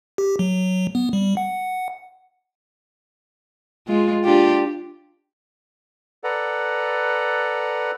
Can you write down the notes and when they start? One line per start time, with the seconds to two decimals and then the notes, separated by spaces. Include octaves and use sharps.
0.18 G4
0.39 F#3
0.95 B3
1.13 G3
1.37 F#5
3.87 G#3 F4
4.24 D4 F4 G4
6.24 A4 B4 D5 F#5 A#5